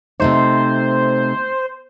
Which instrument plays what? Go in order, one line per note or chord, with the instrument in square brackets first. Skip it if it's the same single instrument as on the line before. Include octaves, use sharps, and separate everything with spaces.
[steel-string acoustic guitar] C3 A3 D#4 [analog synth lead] C5